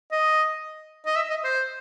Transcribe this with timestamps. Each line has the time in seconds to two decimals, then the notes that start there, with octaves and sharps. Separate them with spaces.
0.12 D#5
1.06 D#5
1.16 E5
1.30 D#5
1.44 C5